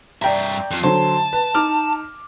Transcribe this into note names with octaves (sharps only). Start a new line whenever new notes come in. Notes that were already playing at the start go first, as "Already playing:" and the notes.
G2 D5 E5 G5 A#5
F2 F3
D3 F#3 C5 A5
B4
D#4 D6 F6